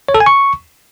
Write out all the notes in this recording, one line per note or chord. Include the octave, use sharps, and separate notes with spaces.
C#5
A4
G#5
C#6